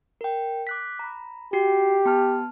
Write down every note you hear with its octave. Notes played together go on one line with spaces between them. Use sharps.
A#4 G5
D6 F#6 B6
A#5 B5
F#4 G4 C7
B3 A5 F6